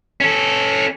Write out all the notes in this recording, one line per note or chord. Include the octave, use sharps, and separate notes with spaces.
C#4 A4